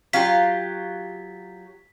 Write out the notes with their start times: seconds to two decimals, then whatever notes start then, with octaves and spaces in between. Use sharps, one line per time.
0.13 F#3 F4 G4 F5 B6